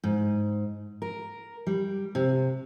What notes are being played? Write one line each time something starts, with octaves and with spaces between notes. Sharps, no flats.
G#2
A#4
G3
C3